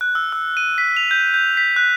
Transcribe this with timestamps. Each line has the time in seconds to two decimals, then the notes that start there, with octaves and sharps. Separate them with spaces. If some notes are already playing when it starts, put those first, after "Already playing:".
0.01 F#6
0.15 E6
0.32 E6
0.57 D#7
0.78 B6
0.97 F7
1.11 G6
1.34 G6
1.57 B6
1.76 F#6